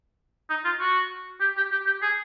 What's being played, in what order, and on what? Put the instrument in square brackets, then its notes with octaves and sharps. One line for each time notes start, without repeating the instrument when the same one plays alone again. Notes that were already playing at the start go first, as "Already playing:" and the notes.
[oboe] D#4
F4
F#4
G4
G4
G4
G4
G#4